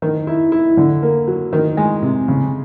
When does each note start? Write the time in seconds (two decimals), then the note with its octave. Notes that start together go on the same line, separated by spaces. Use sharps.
0.02 D#3
0.27 E4
0.52 E4
0.77 D3
1.03 A#3
1.28 F#3
1.53 D#3
1.77 G#3
2.02 C3
2.28 C#3